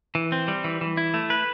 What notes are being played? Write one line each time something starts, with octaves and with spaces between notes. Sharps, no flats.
E3
C4
G3
E3
E3
E4
A3
B4